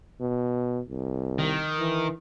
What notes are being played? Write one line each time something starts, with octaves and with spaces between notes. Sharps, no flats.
B2
C2
D#3
E3